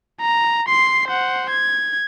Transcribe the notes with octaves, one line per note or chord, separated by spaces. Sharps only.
A#5
C6 C7
C5 F#5
G#6